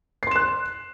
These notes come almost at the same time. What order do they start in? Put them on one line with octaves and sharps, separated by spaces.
C7 C6 E7 F#6